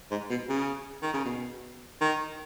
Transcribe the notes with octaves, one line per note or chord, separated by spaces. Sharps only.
G#2
B2
C#3
D#3
C#3
B2
D#3